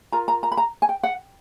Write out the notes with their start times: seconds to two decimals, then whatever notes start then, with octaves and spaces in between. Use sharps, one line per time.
0.12 F4 A#4 A#5
0.28 A#5
0.43 A#5
0.52 B5
0.57 A#5
0.82 G#5
0.89 G5
1.03 F#5